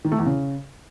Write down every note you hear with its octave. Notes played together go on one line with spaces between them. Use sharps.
D#3
A3
E2
C#3